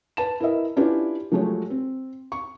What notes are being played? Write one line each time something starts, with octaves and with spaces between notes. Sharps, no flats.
B4 A5 E7
E4 A#4 B4 D#5 E5
C#4 D4 E4 F4 G4 B4
F3 F#3 G#3 A3 G4 C#5
C4
C#6